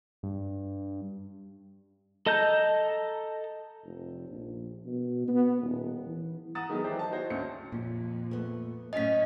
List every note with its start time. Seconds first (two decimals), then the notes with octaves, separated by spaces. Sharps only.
0.23 G2
2.26 A4 D#5 A5 A#5 G6
3.84 F1
4.29 A#1
4.86 B2
5.28 B3
5.62 D#1
6.06 E3
6.55 F#5 A#5 D#6 A6 E7
6.69 D#3 F#3 G#3 A3 B3
6.84 E3 D#4 E4 G4 C5
6.99 A5
7.11 D#4 F#4 C5 C#5
7.30 D2 C#4 C#7
7.72 F2 A#2
8.31 A3 B3
8.93 F#2 A2 C#4 D#5 B6